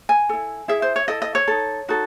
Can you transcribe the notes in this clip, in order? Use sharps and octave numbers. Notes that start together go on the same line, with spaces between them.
G#5
E4 A4
E4 G#4 E5
C5
C#5
E4 A4 D#5
D#5
C#5
D#4 A4
D#4 F#4 A4